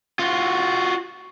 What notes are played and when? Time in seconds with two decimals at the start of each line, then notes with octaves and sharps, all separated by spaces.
0.19 F4 F#4